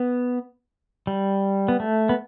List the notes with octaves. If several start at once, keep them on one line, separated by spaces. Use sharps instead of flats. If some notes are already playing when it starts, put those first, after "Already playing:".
Already playing: B3
G3
B3
A3
B3